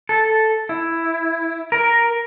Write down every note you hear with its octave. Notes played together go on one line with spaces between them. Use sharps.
A4
E4
A#4